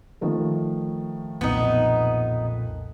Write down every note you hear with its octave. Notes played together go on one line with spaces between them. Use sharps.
D#3 F3 A3
B1 F2 A#2 B3 D#4